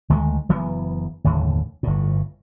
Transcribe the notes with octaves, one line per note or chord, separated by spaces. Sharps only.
D2 D#3 G#3 A3
F#1 E3 F#3 B3
F#1 D#2 A2 D3
G1 A2